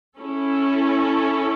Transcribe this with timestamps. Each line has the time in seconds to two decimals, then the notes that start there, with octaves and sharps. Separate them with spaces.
0.18 C#4 E4 A4